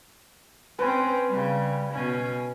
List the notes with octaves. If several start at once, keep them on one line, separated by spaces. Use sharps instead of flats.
C4 C#4 B4
C#3 G3
B2 C#4